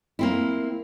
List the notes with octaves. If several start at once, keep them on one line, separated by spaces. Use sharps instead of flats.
A#3 C4 E4